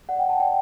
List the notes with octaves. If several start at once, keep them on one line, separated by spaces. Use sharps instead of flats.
D5 F#5
G5
D5
A5
D5 G5